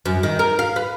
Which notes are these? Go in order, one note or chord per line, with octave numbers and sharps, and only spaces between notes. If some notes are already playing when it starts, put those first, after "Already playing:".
F#2
D#3
A#4
F5
B4